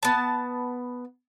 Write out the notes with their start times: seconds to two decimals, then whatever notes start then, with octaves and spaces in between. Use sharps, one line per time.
0.03 B3 A5